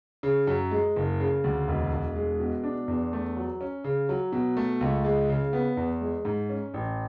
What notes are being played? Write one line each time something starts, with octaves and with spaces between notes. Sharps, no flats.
C#3
F#2
G#3
F#1
C#3
D2
E1
E1
G#3
B2
D4
E2
A3
F#3
C#4
C#3
F#3
B2
A3
C#2
G#3
C#3
B3
E2
G#3
G#2
C#4
A1